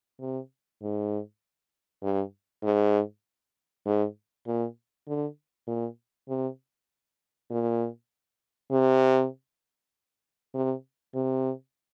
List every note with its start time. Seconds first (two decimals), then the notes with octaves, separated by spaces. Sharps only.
0.20 C3
0.82 G#2
2.03 G2
2.64 G#2
3.86 G#2
4.47 A#2
5.08 D3
5.67 A#2
6.29 C3
7.51 A#2
8.71 C3
10.55 C3
11.15 C3